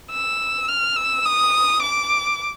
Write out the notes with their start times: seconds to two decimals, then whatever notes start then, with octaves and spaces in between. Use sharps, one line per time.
0.11 E6
0.68 F6
0.96 E6
1.25 D#6
1.83 D6